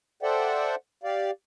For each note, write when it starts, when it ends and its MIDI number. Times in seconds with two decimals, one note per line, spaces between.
0.23 0.75 69
0.23 0.75 72
0.23 0.75 74
0.23 0.75 76
0.23 0.75 78
0.23 0.75 79
1.03 1.31 67
1.03 1.31 74
1.03 1.31 77